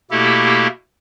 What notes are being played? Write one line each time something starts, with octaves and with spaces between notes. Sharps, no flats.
B2 A3 A#3 E4 G4 A4